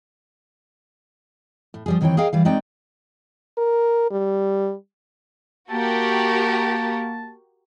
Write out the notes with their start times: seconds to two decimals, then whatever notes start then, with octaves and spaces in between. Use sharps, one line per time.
1.74 A2
1.86 F3 G3 G#4
2.01 D#2 D#3 E3 C4 C#5 G5
2.17 G#4 A#4 D#5 F5 G5
2.33 E3 G3 F5
2.45 G#3 C4 D#4 D5 G5
3.58 A#4
4.11 G3
5.70 A#3 F#4 G4 A#4 A5